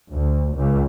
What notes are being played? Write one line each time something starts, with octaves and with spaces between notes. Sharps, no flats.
D2
C#2